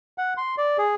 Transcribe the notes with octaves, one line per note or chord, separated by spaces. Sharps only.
F#5
C6
D5
G#4